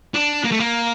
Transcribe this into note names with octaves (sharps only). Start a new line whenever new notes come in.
D4
A#3
A3
A#3